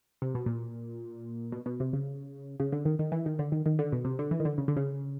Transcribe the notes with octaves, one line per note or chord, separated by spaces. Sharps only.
C3
B2
A#2
B2
B2
C3
C#3
C#3
D3
D#3
D#3
E3
D#3
D3
D#3
D#3
D3
B2
C3
D3
E3
D#3
D3
C#3
D3
C#3